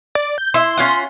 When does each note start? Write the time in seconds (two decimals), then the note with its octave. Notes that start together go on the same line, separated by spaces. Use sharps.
0.15 D5
0.38 G6
0.54 E4 C6
0.77 C#4 F4 F#5